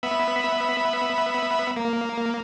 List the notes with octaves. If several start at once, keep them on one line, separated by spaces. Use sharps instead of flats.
B3 E5 B5
A#3